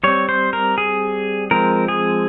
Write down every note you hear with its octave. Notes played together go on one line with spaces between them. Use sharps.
G3 C4 C#5
C5
A#4
G#4
F3 G#3 C4 A#4
G#4